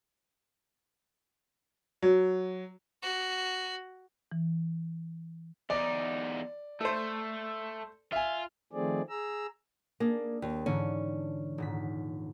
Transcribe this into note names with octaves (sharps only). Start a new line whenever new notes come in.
F#3
F#4
E3
E2 D#4 D5
A3 A4 C5
F4 E5 G#5
D#3 F3 A3 C4 G#4 D5
G#4 A#5 E6
A#3 D4 G#4
D#2
G#2 D3 E3 C#4
D#1 G#2 B6